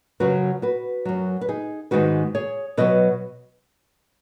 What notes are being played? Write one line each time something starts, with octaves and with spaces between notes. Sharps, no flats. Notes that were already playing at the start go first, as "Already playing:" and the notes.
F#2 C#3 F#3 F#4 B4
F#4 B4
F#2 F#3
B4
D#4 G#4
G#2 D#3 G#3 F#4 B4
G#4 C#5
B2 F#3 B4 D#5